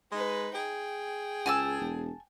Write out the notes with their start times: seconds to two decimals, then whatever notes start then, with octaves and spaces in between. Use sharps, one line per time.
0.12 G#3 D#4 B4
0.55 G#4 G5
1.46 C#2 G#5 A5 E6
1.81 E1